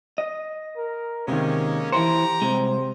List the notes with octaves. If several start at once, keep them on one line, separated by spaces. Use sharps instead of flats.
D#5
A#4
C3 D#3 G#3 A#3 C#4
E3 E4 G4 C5 A#5 C#7
C2 C3 G#3 C5